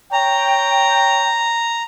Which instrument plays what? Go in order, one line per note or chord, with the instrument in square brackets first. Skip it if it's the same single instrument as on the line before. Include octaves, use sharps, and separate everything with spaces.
[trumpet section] C#5 G5 [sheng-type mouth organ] A#5